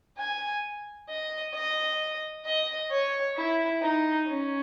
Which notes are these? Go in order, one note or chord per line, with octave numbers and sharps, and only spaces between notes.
G#5
D#5
D#5
D#5
C#5
E4
D#4
C#4